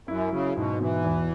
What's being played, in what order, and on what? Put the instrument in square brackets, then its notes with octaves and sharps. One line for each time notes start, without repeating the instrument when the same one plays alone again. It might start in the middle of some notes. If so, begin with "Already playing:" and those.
[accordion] F#2 [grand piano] E4
[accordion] C#3 [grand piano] F#3
[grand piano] G#2 [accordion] B2
[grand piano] B2 [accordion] E3
[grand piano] E2